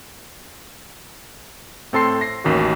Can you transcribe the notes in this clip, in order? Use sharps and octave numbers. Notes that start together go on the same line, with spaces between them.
A2 C4 A4 A5 C6 C7
A#6 C7
A1 D#2 D#3 C#4 F#4